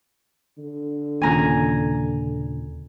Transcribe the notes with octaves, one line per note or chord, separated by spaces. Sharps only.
D3
D#2 A#2 C#3 G#5 A#5 G#6